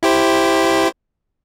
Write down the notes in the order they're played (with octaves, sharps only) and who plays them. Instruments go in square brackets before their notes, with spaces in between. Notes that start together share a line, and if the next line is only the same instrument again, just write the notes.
[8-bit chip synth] E4 G4 C5